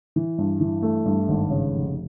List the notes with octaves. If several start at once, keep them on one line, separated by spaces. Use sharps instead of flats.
E3
G2
E3
A3
G2
G#1
C#3
F1